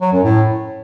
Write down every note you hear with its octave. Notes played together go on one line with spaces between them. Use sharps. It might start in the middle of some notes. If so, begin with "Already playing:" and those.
F#3
F#2
A2